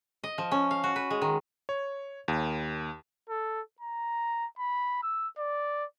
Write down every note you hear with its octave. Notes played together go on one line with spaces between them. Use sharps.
D#5
F3
C#4
F5
F#4
B4
G#3
D#3
C#5
D#2
A4
A#5
B5
E6
D5